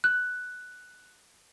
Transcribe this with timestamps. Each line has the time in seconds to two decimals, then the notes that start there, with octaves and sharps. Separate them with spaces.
0.04 F#6